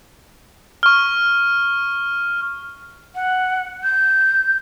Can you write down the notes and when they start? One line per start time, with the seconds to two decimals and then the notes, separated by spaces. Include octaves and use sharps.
0.83 C#6 F6
3.15 F#5
3.83 G6